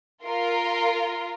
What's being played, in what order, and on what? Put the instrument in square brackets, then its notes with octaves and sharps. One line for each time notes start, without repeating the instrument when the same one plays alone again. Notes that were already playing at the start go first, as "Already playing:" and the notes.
[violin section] F4 A#4